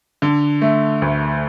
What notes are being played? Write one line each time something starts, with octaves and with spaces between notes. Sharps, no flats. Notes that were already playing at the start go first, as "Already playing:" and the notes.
D3
A3
D2